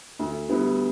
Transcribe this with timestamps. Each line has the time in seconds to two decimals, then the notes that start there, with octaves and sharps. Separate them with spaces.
0.19 D2
0.49 D3 G3 B3 E4